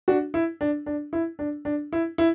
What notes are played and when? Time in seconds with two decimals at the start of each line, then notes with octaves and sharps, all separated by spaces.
0.08 D4 F#4
0.34 E4
0.61 D4
0.86 D4
1.13 E4
1.39 D4
1.65 D4
1.93 E4
2.18 E4